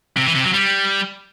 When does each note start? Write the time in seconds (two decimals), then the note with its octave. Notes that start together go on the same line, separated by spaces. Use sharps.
0.17 C3
0.26 E3
0.35 C3
0.44 F#3
0.54 G3